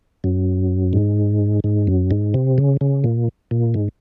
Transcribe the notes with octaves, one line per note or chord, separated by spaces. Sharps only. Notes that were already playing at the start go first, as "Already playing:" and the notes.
F#2
G#2
G#2
F#2
G#2
C3
C#3
C#3
A#2
A#2
G#2